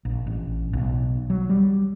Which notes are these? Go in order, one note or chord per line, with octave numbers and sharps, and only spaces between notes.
A#1
A1
B1
F#3
G3